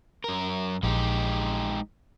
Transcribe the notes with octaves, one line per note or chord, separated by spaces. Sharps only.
F#2 A#4
A#1 G#3 D#4 G4